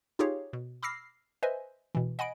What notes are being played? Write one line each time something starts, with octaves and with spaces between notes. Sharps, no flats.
D#4 F4 G4 G#4 C#5 F5
B2
B5 D6 E6 F6 A#6 C7
B4 C5 D#5 E5 G#5
B2 E3
D#5 F#5 G#5 B5 D7